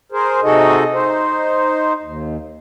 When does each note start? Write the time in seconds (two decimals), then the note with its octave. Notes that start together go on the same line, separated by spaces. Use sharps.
0.12 G#4 A#4 C5
0.43 C3 D#4 F#4 G#4 A4 D#5
0.93 D#4 C5
2.03 D#2